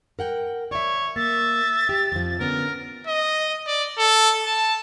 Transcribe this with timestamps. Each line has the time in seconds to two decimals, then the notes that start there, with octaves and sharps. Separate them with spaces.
0.19 A#4 F#5 G5
0.71 C#5 D5 E5
1.16 A#3 E5 A6
1.89 G4
2.12 F2 F3
2.40 D3 B3 C#4 A#4
3.07 D#5
3.67 D5
3.98 A4
4.45 A5